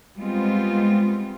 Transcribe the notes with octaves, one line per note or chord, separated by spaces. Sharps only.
G3 G#3 B3 C4 F4